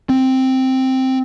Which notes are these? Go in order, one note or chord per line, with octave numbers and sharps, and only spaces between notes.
C4